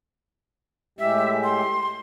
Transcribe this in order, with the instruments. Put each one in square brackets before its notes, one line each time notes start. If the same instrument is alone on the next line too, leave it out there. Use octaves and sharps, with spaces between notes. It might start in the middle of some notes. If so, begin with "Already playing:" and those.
[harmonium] A2 G#3 G4 [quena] E5
[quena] C6